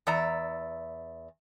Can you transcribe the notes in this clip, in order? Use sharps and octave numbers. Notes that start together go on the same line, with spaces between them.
E2 D5 E5 A#5